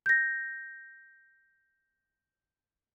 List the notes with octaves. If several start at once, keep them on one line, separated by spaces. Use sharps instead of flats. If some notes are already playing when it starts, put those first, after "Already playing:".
G6 A#6